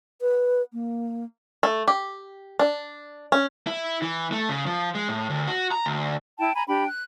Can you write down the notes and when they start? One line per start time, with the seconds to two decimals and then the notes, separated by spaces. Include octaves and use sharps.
0.21 B4
0.73 A#3
1.63 A3
1.88 G4
2.59 D4
3.32 C#4
3.67 E4
4.02 E3
4.32 A3
4.49 C#3
4.66 F3
4.95 G#3
5.09 A2
5.30 D2
5.47 F#4
5.71 A#5
5.86 D2
6.38 E4 G5 A5
6.55 G#5 A#5 B5
6.67 D4 G4 G5 B5
6.86 F#6